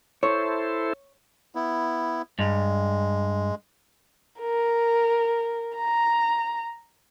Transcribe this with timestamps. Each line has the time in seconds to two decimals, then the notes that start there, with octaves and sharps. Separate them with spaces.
0.23 E4 A4 C5 C#5
1.55 B3 E4
2.39 G2 G#3
4.40 A#4
5.77 A#5